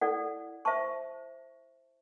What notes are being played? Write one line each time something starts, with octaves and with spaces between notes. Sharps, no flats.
E4 A4 D5 F#5
C5 E5 A5 C#6